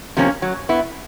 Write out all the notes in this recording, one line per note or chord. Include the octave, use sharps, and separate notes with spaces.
C3 F3 A#3 C#4
F#3
B3 E4